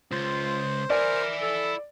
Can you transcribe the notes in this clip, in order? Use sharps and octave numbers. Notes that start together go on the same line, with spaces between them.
C#2 F4 C5
E4 A#4 D5 G#5
A4